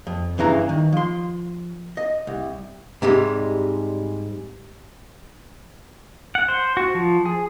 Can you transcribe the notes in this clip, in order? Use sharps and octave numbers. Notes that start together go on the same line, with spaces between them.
F2
G2 C#3 E3 A#5
D#3
F3 C6
D#5
C2
G#2 C3 G3 G#3
F#5
C5
F#4
F3
G#4